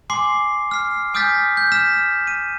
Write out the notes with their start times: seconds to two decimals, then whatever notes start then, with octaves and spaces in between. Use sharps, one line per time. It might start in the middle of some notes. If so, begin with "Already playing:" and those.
0.10 G#5 C6 D6 C7
0.71 F6 C7
1.14 G#5 D#6 F6 G6 A6 B6
1.57 G6
1.72 F6 B6 E7
2.27 D#7